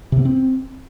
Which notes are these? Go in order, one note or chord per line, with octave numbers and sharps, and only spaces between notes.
C3
B3
C4